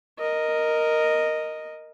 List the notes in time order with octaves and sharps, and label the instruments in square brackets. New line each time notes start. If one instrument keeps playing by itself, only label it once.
[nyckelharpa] A#4 D#5